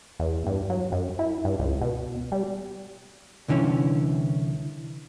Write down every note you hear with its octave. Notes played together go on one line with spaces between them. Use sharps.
E2
G2
F#3
F#2
E4
G2
C#2
B2
G3
C2 D3 E3 C#4